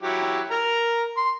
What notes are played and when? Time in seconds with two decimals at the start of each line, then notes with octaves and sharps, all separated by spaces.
0.03 F#3 E4 G4
0.51 A#4 A#5
1.17 C6